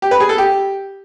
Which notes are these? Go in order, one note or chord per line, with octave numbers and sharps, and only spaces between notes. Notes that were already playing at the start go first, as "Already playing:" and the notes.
G4
B4
G#4
A4
G4